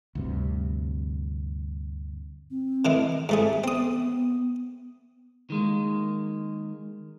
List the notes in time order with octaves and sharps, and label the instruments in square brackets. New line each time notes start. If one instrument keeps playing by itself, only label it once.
[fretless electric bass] D2 G2 C3
[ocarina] C4
[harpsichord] A2 D#3 E3
[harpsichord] G#2 A3 G#4 [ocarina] E5
[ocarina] B3 [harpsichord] C4 D#6
[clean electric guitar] D#3 G#3 A#3